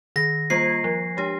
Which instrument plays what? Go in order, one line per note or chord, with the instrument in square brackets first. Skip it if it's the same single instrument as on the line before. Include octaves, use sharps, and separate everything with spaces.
[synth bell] D#3 [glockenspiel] A#6
[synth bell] G3 A#3 F4 C5 [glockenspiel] C7
[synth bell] F3
G#3 D4 G4